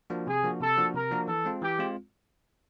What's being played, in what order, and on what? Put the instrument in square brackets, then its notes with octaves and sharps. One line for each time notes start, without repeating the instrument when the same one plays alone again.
[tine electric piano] F3 A#3 D4 F#4
[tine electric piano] C3 [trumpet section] G#4
[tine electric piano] F3 A#3 D4 F#4
[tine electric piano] C3 [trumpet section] A4
[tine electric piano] F3 A#3 D4 F#4
[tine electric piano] C3 [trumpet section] A#4
[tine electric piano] F3 A#3 D4 F#4
[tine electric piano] E3 [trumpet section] A4
[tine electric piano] G#3 C4 F4
[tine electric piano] E3 [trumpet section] G4
[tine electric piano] G#3 C4 F4